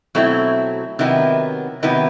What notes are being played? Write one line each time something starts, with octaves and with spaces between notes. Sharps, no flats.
B2 F#3 A3 C4 E4
C3 D#3 F#3 B3 E4
C3 D#3 F#3 B3 E4